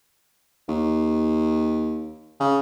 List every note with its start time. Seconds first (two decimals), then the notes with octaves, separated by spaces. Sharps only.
0.69 D#2
2.40 C#3